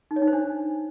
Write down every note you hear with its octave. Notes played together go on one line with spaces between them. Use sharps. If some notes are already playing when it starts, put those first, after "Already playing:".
D#4
C#5
D#4
C5
D4